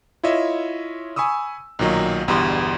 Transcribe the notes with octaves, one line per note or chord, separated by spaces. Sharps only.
E4 F4 C#5 D#5 E5
G#5 B5 C#6 D#6 E6
B1 A#2 D#3 F#3 D#5
G1 E2 G2 B2 G3 C6